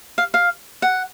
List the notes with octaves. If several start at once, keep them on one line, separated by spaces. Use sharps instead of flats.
F5
F5
F#5